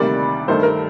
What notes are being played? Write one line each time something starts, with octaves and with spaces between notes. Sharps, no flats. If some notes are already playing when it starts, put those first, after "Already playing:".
Already playing: D2 C3 D#3 G3 A#3 D5
G2 D#3 A3 C5
A#4